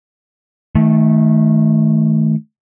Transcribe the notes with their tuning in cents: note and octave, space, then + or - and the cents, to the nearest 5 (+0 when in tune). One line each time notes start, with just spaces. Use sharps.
D#3 +20 A3 -15